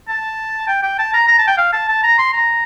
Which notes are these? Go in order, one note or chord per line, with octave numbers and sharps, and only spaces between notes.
A5
G5
G5
A5
A#5
A#5
A5
G5
F5
A5
A5
A#5
C6
A#5